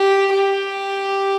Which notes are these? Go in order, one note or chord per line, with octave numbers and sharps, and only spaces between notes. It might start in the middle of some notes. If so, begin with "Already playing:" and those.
Already playing: G4
G4